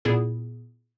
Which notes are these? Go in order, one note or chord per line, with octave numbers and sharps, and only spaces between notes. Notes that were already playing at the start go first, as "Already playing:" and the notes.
A#2 B3 E4 G#4